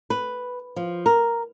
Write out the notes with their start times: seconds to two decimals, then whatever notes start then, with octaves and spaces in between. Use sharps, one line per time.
0.10 B4
0.76 F3
1.06 A#4